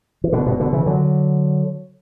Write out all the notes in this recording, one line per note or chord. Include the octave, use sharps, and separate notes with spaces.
E3
B2 D3
G2 B2
B2 D3
C#3 E3
D3 F#3